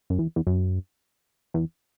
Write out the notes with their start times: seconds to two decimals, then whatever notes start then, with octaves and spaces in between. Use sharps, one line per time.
0.10 F#2
0.19 E2
0.36 E2
0.47 F#2
1.54 E2